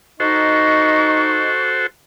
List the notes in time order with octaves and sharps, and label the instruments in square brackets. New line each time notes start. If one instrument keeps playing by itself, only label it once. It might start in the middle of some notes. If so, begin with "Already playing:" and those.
[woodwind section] D#4 D#5 [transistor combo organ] F#4 A4 C5 [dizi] C#6